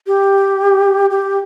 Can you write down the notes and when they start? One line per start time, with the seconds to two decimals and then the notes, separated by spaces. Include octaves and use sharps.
0.07 G4
1.10 G4